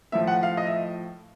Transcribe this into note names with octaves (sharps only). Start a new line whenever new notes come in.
A2 F3 E5
F#5
F5
D#5
E5